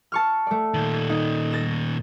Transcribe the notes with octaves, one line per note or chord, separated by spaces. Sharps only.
A5 C#6 F6
A3 D5
A#2 D#3
D#4
A6 A#6 E7